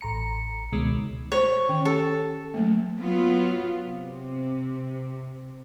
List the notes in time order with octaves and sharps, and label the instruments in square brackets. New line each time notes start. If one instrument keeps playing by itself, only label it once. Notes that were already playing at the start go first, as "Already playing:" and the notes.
[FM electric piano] A1 A#5 C#7
C#2 B2 D#3 G#3
[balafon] C5 [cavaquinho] C#5
[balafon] D#3 C#4 G5
[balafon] G4 [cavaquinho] A4
[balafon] F#3 A3 A#3
[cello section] F#3 B3 F4
C3